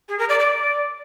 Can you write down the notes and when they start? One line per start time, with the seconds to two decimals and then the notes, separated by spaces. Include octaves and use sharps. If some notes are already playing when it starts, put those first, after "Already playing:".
0.09 G#4
0.19 A#4
0.29 D5
0.39 D5